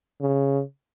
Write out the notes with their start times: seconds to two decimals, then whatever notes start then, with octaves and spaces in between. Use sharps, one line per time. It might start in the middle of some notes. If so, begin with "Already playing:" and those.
0.21 C#3